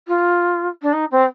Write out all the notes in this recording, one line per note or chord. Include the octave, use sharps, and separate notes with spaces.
F4
D4
D#4
C4